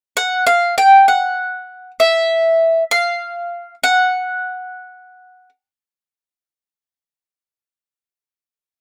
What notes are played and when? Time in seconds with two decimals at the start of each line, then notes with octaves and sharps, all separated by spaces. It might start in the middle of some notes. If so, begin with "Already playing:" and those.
0.17 F#5
0.47 F5
0.78 G5
1.08 F#5
2.00 E5
2.91 F5
3.83 F#5